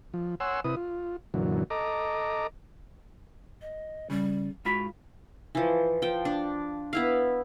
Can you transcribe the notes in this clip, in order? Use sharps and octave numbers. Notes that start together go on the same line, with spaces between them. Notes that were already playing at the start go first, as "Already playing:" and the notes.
F3
C#5 F#5 G#5 C6 E6
C3 E4 B4 D#6
F4
F#2 A#2 D3 E3 F#3
A4 D#5 A#5 D6
D#5
C#3 G3
G#2 F4 F#4 B5
E3 F3
F3 G5
D4
B3 E4 F5